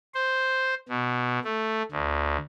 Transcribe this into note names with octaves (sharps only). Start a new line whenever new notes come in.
C5
B2
A3
D2